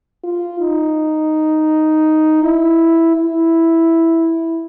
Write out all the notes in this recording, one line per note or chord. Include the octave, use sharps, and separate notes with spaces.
F4
D#4
E4
E4